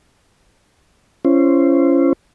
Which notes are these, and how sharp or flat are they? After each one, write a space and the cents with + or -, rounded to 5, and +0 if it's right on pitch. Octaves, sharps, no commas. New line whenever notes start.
C#4 +0 E4 +45 C5 +0